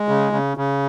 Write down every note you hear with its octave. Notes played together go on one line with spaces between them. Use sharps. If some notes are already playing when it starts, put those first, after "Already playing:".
Already playing: G#3
C#3
C#3
C#3